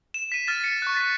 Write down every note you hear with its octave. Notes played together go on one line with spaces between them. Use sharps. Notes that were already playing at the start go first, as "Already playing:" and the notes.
E7
B6 D#7
F6 A6 E7
B6 C#7
C#6 F#6
A6 B6